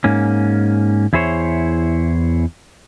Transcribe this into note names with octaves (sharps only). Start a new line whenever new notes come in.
G#2 A#3 C#4
E2 E4 G#4 C5 C#5